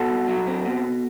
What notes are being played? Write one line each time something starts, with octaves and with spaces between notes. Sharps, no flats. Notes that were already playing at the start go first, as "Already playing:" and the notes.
Already playing: B2 F#4 A4
C2
F#3
C4
B2